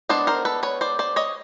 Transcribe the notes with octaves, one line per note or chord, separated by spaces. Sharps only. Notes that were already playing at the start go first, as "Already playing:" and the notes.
G#3 B3 D4 C5 D5
A#4 C5
A4 B4
B4 C#5
C5 D5
C5 D5
C#5 D#5